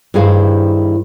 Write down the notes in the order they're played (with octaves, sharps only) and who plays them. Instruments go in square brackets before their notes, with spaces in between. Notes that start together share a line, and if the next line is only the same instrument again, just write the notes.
[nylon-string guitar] G2 D#3 E4 G#4 C5 F5